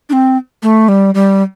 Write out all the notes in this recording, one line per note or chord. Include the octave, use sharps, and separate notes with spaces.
D4
C4
A3
G3
G3